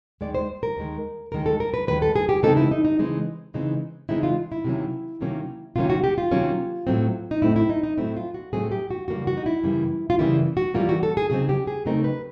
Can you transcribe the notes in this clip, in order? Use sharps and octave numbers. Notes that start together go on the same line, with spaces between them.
D#2 D#3 G#3 D5
C5
A#4
D#2 D#3 G#3
D#2 D#3 G#3 A#4
A4
A#4
B4
D#2 D#3 G#3 B4
A4
G#4
G4
C#3 E3 G#3 C4 D#4 A4
E4
D#4
D#4
C#3 E3 G#3 C4 D#4
C#3 E3 G#3 C4 D#4
C#3 E3 G#3 C4 D#4 E4
F4
E4
C3 D#3 F#3 A#3 C#4
C3 D#3 F#3 A#3 C#4
C3 D#3 F#3 A#3 C#4 F4
F#4
G4
F4
C3 D#3 F#3 A#3 C#4
A2 F#3 A3 C4
D#4
A2 F#3 A3 C4 E4
E4
D#4
D#4
A2 F#3 A3 C4 E4
F4
F#4
A2 F#3 A3 C4 G#4
G4
F#4
F#2 C#3 E3 G3 A#3 F#4
F#4
D#4
E4
F#2 C#3 E3 G3 A#3
F4
F#2 C#3 E3 G3 A#3 E4
F#4
F#2 C#3 E3 G3 A#3 F4
F#4
A4
G#4
C#3 F#3 A3 C4 D#4 G#4
G4
G#4
C#3 F#3 A3 C4 D#4 A#4
B4